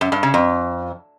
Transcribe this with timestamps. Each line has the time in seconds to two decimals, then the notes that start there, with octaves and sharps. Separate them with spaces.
0.01 F#2
0.12 G2
0.23 C#3
0.34 F2